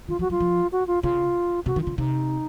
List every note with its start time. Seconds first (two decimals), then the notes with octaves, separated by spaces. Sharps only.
0.08 D#3 F4
0.19 F3 F#4
0.30 F#3 F4
0.40 F3
0.72 F#4
0.87 F4
1.03 C#3 F4
1.66 C3 F#4
1.76 D#3
1.81 F4
1.87 C#3
1.98 C3 D#4